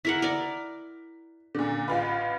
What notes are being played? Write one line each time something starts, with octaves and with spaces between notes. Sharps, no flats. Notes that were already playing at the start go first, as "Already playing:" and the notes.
E4 A#4 F#5 B6
A#4 D5
A#2 D3
A1 F4 B4